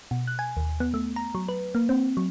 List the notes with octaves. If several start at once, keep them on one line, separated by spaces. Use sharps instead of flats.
B2
F#6
G#5
D#2
B3
A3
A#5
F#3
B4
A#3
C4
F#3